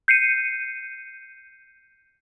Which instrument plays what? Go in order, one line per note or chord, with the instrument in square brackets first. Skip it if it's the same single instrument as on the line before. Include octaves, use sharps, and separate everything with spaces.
[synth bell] G6 C7 C#7 D#7